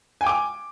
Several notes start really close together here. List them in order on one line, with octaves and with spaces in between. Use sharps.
G#5 G5 D6